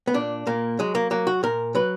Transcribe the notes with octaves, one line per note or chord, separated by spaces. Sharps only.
B3
A#2 D4
A#2 A#3
F#3 G#3
A#3
F#3 A#3
F#4
A#2 A#4
F#3 B4